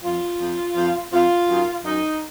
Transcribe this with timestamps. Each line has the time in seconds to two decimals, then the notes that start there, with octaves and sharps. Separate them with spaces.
0.03 F2 F3 F4
0.39 F2 F3
0.75 F2 F3
1.12 F2 F3 F4
1.48 F#2 D#3
1.84 F#2 D#3 D#4